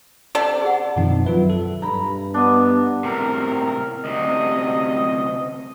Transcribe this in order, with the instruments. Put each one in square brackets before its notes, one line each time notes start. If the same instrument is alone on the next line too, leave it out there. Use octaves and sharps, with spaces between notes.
[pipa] C3 A4 D5 [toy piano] C#4
[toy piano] G#4 F#5
[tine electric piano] F#2 B2 D#3 F3 C4 D#4
F#3 F4 B4 E5
A4
[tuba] G2 [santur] A#5 B5
[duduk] B3 [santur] D4 D#5
[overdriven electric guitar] A2 C3 [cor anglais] A#4
[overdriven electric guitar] D2 C3 [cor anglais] D#5